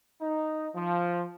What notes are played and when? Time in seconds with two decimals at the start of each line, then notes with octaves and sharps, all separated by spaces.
0.21 D#4
0.75 F3